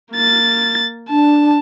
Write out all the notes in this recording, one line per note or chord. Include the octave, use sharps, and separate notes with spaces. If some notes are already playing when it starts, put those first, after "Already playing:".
A#3 A6
D4 A5